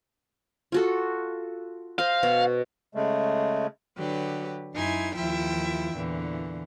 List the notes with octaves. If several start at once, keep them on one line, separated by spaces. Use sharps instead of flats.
F4 F#4 A4
C5 D#5 F5
B2 F#4
C#3 G#3 A3
D3 F#3 G4 B4
F#2 D#4 E4 G#5 C6 G#6
D#2 F3 E4 F4 E5 G5
E2 A#2 D3 E3